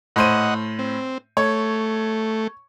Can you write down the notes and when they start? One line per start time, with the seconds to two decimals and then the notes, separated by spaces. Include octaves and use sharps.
0.16 A2 C5 D#5 F#5 D#7
0.79 C4
1.37 A3 C#5